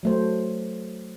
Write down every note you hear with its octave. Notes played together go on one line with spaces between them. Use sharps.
F#3 A3 C5